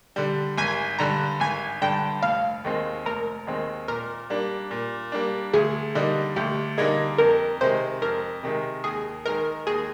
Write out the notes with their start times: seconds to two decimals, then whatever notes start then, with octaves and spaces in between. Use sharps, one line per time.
0.16 D3 G3
0.58 G#1 G#5
0.99 G2 D3 G3 A#5
1.40 G#1 G#5
1.81 G2 D3 G3 G5
2.22 F1 F5
2.64 D#2 D#3 G#3 C4
3.06 F1 A#4
3.47 D#2 D#3 G#3 C4
3.88 A#2 A#4
4.30 G3 A#3 D4
4.71 A#2
5.12 G3 A#3 D4
5.53 D2 G#4
5.95 D3 G3 A#3 D#4
6.36 D2 G4
6.78 D3 G3 A#3 D#4 G#4
7.18 F2 A#4
7.61 C3 D#3 G#3 C5
8.02 F2 A#4
8.43 C3 D#3 G#3
8.84 D#2 G#4
9.26 D#3 G#3 D#4 A#4
9.67 D#2 G#4